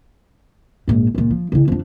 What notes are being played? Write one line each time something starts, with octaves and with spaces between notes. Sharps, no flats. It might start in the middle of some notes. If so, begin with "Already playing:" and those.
A#1 G#2
C#2 A#2
F3
C#3 E4
F2 D4